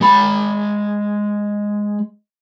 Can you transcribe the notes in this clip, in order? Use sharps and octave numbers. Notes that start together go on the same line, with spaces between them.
G#3 B5